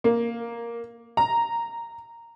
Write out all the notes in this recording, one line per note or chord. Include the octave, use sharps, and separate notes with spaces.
A#3
A#5